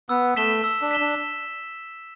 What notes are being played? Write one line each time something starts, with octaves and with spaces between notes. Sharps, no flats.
B3 E6
A3 B6 E7 G7
E6
D4
B6 E7 G7
D4